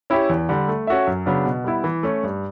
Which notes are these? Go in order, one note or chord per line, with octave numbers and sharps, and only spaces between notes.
C#4 E4 G4 C#5
E2
D3 G3
A3
C#4 F#4 A4 E5
F#2
C#3 F#3 B3 D4
B2
G3 B3 E4
E3
A3 C#4
G2